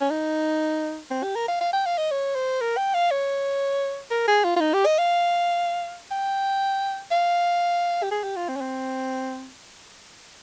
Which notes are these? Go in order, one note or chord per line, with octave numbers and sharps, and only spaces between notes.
C#4
D#4
C4
G4
A#4
F5
F5
G5
F5
D#5
C#5
C5
A#4
G5
F5
C#5
A#4
G#4
F4
F4
D#4
G4
D#5
F5
G5
F5
G4
G#4
G4
F4
C4
C#4
C4